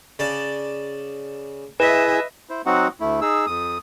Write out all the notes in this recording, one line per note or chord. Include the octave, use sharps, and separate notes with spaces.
C#3 D5 A5
E4 G#4 B4 D#5 E5 G#5
E4 C5
F#3 C4 D#4 F#4 F#5
D2 A3 E4
D#4 G#4 E6
F2 D#6